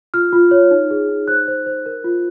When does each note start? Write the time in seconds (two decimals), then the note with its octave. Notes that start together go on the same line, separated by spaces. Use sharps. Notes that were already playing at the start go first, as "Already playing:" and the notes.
0.14 F4 F6
0.33 F4
0.51 C#5
0.71 D#4
0.91 G#4
1.09 D#4
1.28 C5 F#6
1.48 C5
1.66 C5
1.86 A#4
2.04 F4